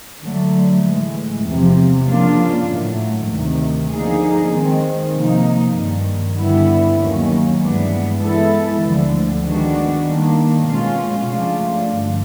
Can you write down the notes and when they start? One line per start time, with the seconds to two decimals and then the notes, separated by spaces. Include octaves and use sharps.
0.21 D3 F#3 A3
0.82 A2 E3 G#3
1.43 E2 C3 F3
2.05 C#3 F3 A#3 D4 F4
2.67 A2 F#3 A3
3.28 D2 C3 D#3
3.89 D3 F3 A#3 D#4 G#4
4.51 D#3 G#3 C4
5.13 C3 F3 A#3 D#4
5.74 G2 D#3 G3
6.36 G2 D3 G3 B3 E4
6.98 D#2 D#3 F#3 A#3 C#4
7.59 G2 E3 G#3 B3 D4
8.20 E3 G#3 B3 E4 A4
8.82 D2 D3 F3
9.43 D#3 G#3 B3 D4 F#4
10.05 D#3 G3 A#3 D4
10.66 B2 G#3 C#4 F4
11.27 C#3 F3 A3 D4 F4
11.89 G2 D3 F3